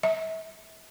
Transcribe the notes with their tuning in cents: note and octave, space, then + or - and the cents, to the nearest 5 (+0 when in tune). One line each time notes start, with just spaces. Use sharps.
E5 -35